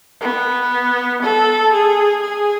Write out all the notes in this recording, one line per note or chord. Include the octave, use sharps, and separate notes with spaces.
B3
A4
G#4
G#4